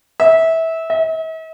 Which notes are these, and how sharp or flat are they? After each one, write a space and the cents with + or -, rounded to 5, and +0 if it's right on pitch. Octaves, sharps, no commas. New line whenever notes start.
E5 -20
E5 -45